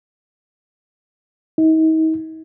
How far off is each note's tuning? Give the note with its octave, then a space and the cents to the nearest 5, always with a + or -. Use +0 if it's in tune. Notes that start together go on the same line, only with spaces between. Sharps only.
D#4 +40